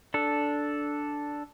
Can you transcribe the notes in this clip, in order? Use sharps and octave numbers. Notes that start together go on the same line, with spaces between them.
D4 A4